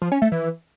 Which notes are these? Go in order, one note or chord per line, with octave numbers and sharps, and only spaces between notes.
F3
C#4
A3
E3